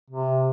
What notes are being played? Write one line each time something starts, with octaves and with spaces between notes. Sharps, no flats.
C3